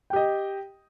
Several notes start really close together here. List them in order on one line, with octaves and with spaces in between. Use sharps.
G5 G4 D#5